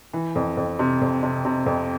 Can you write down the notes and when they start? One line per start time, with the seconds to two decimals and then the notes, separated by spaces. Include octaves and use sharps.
0.13 E3
0.35 F2
0.57 F2
0.79 C3
1.01 F2
1.23 C3
1.45 C3
1.66 F2